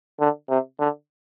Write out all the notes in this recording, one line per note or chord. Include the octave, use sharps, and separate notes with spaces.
D3
C3
D3